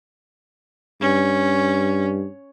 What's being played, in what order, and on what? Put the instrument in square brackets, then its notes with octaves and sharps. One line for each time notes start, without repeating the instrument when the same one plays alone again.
[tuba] G2 [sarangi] C#4